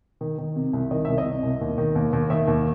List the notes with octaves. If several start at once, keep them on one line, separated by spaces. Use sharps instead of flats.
D#3
D#3
C3
C2
D#3 D#5
C2 E5
D#5
C3
C2
D#2
D#3
D#2
D#2
D#3 E5
D#2